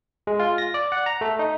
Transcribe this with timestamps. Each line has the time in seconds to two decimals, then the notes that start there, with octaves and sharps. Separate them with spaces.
0.27 G#3
0.39 F4
0.58 A#6
0.74 D5
0.92 F#5
1.06 A#5
1.21 A3
1.39 D#4